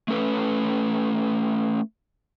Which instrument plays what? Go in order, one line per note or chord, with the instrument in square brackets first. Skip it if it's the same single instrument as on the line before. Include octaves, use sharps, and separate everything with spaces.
[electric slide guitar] A3 C#4 A4 B4